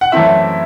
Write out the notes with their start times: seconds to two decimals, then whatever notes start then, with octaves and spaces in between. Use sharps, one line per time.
0.01 F#5
0.12 F#2 E3 A3 C4 E4 E5